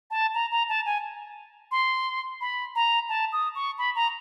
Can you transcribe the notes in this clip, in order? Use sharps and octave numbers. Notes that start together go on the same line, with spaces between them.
A5
A#5
A#5
A5
G#5
C6
B5
A#5
A5
D#6
C#6
B5
A#5